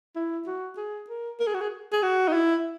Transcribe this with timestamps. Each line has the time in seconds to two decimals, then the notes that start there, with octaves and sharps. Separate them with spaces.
0.16 E4
0.47 F#4
0.77 G#4
1.09 A#4
1.40 A#4
1.47 G#4
1.54 F#4
1.61 G#4
1.92 G#4
2.03 F#4
2.28 D#4
2.33 E4